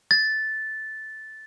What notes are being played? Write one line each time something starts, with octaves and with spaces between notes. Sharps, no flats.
A6